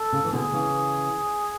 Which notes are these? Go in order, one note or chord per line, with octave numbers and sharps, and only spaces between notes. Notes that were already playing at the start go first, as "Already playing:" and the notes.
Already playing: A4
C#3
E3
B2 D3 G#4
C#3 E3